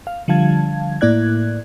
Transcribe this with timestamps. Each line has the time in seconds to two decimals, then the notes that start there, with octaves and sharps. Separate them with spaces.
0.07 F5
0.28 D3 F3 G3 F5 A5 G#6
1.01 A2 A#3 E4 D5 F#6 G#6